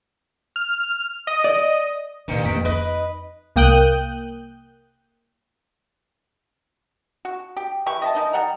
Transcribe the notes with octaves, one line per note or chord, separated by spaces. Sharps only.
F6
D#5
D5
G2 A#2 D#3
F2 A#3 C#4 B6 D7
D#4 B4 D#5
C2 A#3 G5 D#6 F#6 G6
F#4
G4
E3 G4 C#6
D#5 E5 A5
E3 D#4 D#5
G3 F#5 A#5